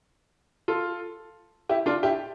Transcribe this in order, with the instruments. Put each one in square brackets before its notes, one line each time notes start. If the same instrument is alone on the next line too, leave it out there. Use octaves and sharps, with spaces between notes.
[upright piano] F4 A4
E4 G4
D4 F4
E4 G4